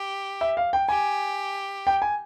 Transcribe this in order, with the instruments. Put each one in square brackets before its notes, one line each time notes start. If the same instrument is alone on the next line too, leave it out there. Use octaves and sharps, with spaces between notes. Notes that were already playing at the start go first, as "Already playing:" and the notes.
Already playing: [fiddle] G4
[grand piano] E5
F5
G5
[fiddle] G4 [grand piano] G#5
[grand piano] G5
G#5